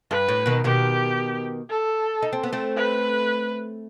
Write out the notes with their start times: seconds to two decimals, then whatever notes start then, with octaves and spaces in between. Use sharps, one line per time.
0.11 G2 B4
0.28 A2
0.46 B2 D#3
0.64 B2 D#3 G4
1.70 A4
2.22 D#4
2.33 C4
2.43 B3
2.53 A3 C4
2.77 B4